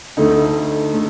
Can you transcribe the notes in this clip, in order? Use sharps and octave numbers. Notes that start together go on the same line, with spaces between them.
D2 D3 A3 D#4
D3 A3